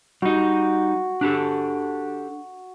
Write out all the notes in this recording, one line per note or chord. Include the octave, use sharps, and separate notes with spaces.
G3 D#4 F#4
D4 G4 A4